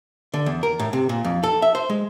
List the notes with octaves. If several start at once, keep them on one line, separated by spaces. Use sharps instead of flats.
D3
E2
A#4
A2
C3
A#2
F2
A4
E5
C5
G#3